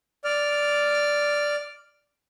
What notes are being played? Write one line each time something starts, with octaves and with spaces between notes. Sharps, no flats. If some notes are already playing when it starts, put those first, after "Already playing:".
D5 F6